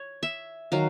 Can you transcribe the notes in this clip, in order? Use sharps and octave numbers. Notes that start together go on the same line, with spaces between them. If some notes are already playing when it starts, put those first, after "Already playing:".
Already playing: C#5
E5
D#3 F#3 F5